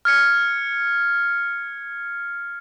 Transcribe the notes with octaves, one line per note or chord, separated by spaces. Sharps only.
F6 G#6 C#7